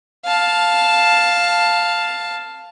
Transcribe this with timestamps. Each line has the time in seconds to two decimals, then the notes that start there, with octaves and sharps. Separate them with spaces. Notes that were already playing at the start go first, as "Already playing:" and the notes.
0.25 F5 A5